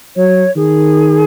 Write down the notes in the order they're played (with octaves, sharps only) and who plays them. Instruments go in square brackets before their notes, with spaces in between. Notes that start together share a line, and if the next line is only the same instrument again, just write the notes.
[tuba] F#3 [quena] C#5
[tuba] D#3 [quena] G#4